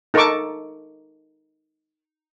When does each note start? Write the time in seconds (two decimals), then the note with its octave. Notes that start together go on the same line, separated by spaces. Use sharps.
0.14 D#4 A4 A#4 A5 C#6 D6